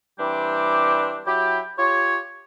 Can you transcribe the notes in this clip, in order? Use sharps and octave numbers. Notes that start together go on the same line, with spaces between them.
E3 G3 C4 D4 G4
F#3 E4 G4
F4 G4 C#5